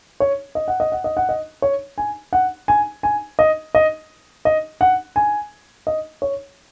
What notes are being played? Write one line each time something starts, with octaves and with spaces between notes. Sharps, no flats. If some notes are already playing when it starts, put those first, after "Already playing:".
C#5
D#5
F#5
D#5
F#5
D#5
F#5
D#5
C#5
G#5
F#5
G#5
G#5
D#5
D#5
D#5
F#5
G#5
D#5
C#5